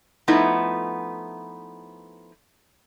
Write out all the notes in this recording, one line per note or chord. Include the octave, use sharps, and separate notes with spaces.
F3 A3 B3 D#4 E4